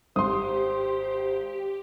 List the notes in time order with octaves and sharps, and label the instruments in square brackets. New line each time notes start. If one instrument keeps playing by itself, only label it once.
[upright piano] G#1 [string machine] G4 [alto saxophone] C5 [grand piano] C6 D#6